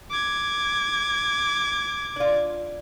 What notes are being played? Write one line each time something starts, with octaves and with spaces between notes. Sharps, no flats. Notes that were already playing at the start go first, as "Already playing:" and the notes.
D6 G#6
D4 F4